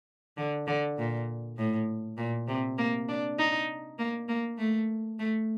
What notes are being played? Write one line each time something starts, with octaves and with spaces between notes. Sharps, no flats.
D3
D3
A#2
A2
A#2
C3
A#3
D4
D#4
A#3
A#3
A3
A3